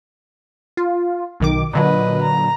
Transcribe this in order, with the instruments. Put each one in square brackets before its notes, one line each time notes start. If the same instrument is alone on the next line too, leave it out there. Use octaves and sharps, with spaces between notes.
[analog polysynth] F4
B1 D#3 D6
[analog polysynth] A#2 D3 F#3 [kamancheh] B4 D#5
[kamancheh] A#5